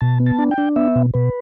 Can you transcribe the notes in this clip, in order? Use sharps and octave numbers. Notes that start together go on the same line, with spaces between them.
B2 A5
B3
A5
D4
G5
D4
B3 E5
B2
B2 B4